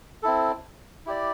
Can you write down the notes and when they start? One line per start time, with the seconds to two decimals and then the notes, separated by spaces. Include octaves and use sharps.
0.23 C4 E4 A4
1.06 E4 G4 D5